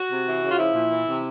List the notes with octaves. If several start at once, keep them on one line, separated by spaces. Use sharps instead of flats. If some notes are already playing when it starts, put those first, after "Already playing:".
Already playing: F#4
C3
E3
C#3
F4
F3 E4
A#2
E3
C3